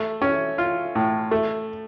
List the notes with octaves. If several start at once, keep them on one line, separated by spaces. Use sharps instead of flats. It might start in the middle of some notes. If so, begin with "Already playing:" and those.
Already playing: A3
C#4
F4
A2
A3